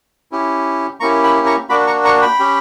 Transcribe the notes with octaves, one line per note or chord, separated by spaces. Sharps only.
C#4 E4 G4
A#3 C#4 E4 G4 A#5 C#6
G5 B5
A#5 C#6
A#3 D4 F#4 B5 D6
A#5 C#6
A#5 C#6
G5 B5
C#4 G4